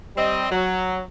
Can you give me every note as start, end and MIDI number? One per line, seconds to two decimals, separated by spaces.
0.17 0.47 55
0.17 0.47 60
0.17 0.47 75
0.50 1.00 54